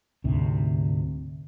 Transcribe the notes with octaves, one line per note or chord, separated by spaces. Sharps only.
D2 G#2 C3